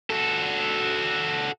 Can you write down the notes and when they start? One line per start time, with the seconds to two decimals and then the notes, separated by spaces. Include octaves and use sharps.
0.10 F#4 A4